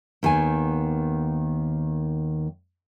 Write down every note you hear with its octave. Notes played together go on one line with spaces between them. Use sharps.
D#2 D#3 B3 G#5